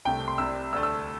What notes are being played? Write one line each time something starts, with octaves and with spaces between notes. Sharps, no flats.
C2 C3 A3 G5
C6
C2 C3 G3 E6
D2 D3 A3 E6
E6